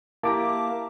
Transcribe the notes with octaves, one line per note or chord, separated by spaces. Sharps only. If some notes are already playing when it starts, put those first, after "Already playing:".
A#3 E4 G4 A5 A#5 D6